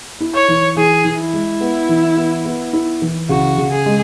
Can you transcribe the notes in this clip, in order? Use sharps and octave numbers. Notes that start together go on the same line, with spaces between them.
E4
C#5
E3
E3 G#4
E3
E4
G#3
B3
E3
B3
B3
E4
E3
C#3 F#4
C#3
G#4
G#3